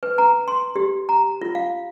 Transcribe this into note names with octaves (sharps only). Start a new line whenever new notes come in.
B4
A#5
C6
G4
A#5
F4
F5